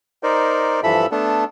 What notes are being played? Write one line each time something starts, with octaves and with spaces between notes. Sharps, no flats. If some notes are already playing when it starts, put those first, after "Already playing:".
D#4 A#4 C5 D5
G2 E3 F3 A4 E5 B5
A3 B3 D4 A4